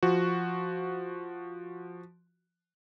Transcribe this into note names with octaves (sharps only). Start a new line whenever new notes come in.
F3 F#4